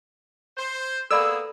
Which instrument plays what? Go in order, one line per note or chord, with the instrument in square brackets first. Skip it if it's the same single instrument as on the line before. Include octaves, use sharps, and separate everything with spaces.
[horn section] C5
[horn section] A#3 B3 G#4 [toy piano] A4 D5 B5 [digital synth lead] E6